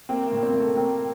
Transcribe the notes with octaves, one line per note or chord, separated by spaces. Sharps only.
A#3 C4
A#3
A2
A#3
C4
A2 A#3
A3
A#3 C4